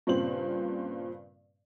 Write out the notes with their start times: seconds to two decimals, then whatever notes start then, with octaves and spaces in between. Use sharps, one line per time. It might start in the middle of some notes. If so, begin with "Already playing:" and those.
0.07 G2 A#2 C#3 C4 C5 F#7